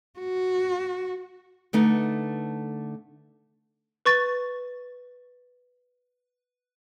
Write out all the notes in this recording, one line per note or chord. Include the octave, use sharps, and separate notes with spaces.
F#4
D3 A3 B3 D#4
B4 C#6 A6